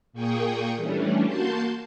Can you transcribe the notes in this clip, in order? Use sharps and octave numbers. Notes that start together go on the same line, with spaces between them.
A#2 A#3 G#4 G5 C#6 D#6
E3 G3 A3 C#4 D4
A#3 F#4 A5 C6 G6